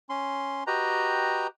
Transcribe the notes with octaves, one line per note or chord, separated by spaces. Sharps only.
C#4 C6
F#4 G4 B4 D#5 G5 A#5